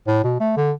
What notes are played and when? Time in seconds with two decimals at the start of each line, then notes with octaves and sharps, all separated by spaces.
0.07 A2
0.24 B2
0.40 A3
0.57 D3